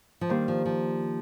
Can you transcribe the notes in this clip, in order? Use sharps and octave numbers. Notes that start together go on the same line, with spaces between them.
F3
D#3 G3 A#3 D4 G4 C5
F3
F3